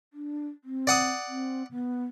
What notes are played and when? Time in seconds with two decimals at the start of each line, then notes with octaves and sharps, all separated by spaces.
0.13 D4
0.64 C4
0.87 D5 F#5 D#6
1.28 C4
1.71 B3